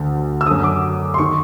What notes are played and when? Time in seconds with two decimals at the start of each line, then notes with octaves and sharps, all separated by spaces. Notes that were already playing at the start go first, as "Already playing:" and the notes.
Already playing: D2 D3
0.41 E6
0.47 F#2 D3 D#6
0.64 D6
1.14 C6
1.18 D#3 C#6